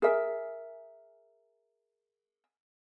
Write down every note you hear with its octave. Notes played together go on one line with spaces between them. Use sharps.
G#4 A#4 E5